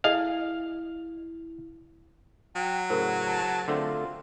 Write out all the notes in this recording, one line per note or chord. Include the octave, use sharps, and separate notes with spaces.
A3 E4 G#4 D#5 F5
F#3 G5
A2 C#3 G#4 A#4 C5 F#5
A5
D3 A3 C4 F4